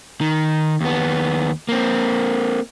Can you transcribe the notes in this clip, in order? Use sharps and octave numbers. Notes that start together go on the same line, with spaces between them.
D#3
D#2 B3
A#3 C4